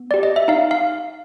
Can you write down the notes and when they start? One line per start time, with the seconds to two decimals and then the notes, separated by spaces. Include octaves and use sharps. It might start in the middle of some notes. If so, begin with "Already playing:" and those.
Already playing: B3
0.11 G4 D5
0.23 D#5
0.36 E5
0.48 D#4 F5
0.71 F5